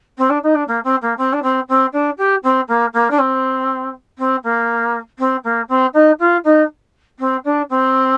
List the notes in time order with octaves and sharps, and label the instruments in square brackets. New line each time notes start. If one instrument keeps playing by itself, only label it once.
[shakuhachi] C4
D4
D#4
D4
A#3
C4
A#3
C4
D4
C4
C4
D4
G4
C4
A#3
A#3
D4
C4
C4
A#3
C4
A#3
C4
D#4
F4
D#4
C4
D4
C4